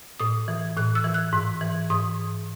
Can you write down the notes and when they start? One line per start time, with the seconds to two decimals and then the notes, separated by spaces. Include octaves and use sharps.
0.20 A2 D#6
0.48 E3
0.76 A2 F#6
0.95 E6
1.04 E3
1.14 F#6
1.33 G#2
1.61 E3
1.90 G#2 D#6